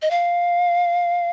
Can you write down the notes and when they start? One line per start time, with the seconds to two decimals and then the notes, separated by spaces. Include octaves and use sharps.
0.02 D#5
0.11 F5